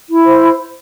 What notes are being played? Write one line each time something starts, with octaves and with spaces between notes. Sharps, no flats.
E4
C5